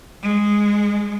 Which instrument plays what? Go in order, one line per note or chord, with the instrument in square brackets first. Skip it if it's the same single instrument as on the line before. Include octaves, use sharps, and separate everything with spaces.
[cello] G#3